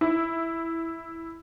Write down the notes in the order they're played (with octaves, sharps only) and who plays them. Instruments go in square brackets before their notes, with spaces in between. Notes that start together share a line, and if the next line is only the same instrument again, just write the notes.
[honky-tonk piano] E4